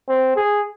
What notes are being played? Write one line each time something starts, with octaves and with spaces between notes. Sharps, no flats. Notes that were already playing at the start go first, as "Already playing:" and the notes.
C4
G#4